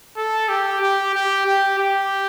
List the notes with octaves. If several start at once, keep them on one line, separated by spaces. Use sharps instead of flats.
A4
G4
G4
G4
G4
G4